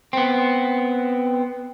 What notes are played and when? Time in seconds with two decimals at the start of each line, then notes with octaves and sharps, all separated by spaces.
0.13 B3 C4